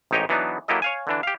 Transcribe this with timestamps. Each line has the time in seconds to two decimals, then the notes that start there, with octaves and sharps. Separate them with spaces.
0.11 A1 G#2 D#4 G4 C#5 D#5
0.29 E3 F#3 B3 D4 D#4
0.68 F#3 A#3 E4 G4 A4 D#5
0.82 C#5 F5 G#5
1.07 D3 E3 D4
1.23 G4 F5